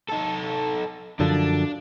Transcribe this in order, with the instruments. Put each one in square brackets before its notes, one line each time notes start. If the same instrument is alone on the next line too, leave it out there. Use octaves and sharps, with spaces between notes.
[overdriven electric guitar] D#4 A4
[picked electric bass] F#2 D3 F3 [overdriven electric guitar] D4